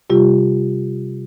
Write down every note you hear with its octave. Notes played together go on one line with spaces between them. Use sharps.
C3 G3 F4 G4